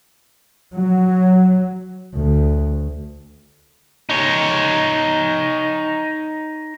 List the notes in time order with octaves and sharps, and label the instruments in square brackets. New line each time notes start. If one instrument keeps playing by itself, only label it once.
[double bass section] F#3
[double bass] D2
[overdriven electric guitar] D#4 C#5